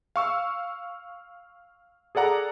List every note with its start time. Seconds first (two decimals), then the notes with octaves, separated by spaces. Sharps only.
0.16 F5 C#6 E6
2.15 G#4 A4 D5 F#5 A#5